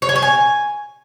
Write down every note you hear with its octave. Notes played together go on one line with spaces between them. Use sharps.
C#5
G#5
C#5
G#5